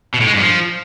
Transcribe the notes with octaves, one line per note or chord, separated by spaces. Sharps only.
B2
A2
G#3
G2
F3